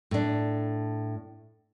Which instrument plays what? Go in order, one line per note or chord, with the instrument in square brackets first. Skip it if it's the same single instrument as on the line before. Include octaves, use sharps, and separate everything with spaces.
[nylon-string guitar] A2 D4